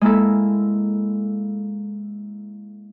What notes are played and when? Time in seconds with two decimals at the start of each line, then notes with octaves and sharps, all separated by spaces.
0.01 G#3 A#3 E4 A4